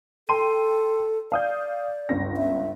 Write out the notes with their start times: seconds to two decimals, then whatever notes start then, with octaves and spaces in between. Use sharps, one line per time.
0.29 A4 G5 C6 D#7
1.32 D5 F5 D#6 G6
2.09 G1 C#2 A#6
2.37 E5